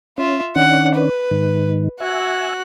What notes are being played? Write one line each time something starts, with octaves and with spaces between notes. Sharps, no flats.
C#4 F4 E5
D#3 C#4 D4 F#5
B4
G#2 D#3
F#4 E5 G#5 F#6